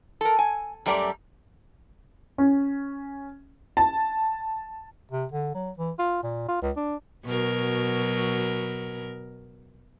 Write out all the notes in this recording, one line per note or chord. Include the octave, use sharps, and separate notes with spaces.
A4 A#4
G#5
F#2 G3 A3 D5 A#5
C#4
A5
C3
D3
F#3
E3
F4
A#2
F4
C#2
D4
B2 F#3 A#4